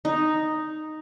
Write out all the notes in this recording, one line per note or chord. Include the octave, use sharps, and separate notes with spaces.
D#4